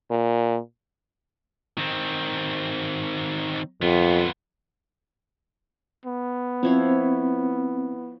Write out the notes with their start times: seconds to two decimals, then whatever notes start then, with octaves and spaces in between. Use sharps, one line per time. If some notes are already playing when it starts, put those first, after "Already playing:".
0.11 A#2
1.78 D#3 C4
3.82 F2 B3 F4
6.06 B3
6.63 F3 C4 E4 C#5